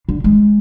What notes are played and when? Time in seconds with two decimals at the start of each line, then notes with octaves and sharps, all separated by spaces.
0.09 D3
0.24 G#3